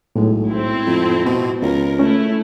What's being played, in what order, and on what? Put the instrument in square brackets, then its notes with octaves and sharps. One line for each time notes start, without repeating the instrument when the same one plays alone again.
[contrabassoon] B1 [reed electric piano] A2 G#3
[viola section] C4 E4
[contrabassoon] F2
B2
[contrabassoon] C#2 [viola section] A#4
[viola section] A3 E4 [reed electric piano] C#4